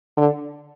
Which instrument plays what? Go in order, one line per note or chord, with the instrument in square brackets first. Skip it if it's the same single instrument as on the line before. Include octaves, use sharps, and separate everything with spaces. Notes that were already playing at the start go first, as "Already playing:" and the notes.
[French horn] D3